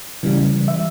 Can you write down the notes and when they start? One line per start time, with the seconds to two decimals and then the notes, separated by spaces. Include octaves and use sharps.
0.23 C#3 E3 G3
0.68 E5